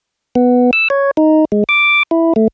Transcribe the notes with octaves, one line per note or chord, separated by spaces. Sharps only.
B3
E6
C#5
D#4
G#3
D6
E4
A3